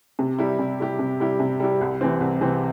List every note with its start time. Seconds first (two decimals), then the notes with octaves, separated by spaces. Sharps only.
0.19 C3
0.39 G3 E4 G4
0.59 C3
0.80 G3 E4 G4
0.99 C3
1.20 G3 E4 G4
1.40 C3
1.60 G3 E4 G4
1.81 C2
2.01 C3 E3 C4
2.21 C2
2.41 C3 E3 C4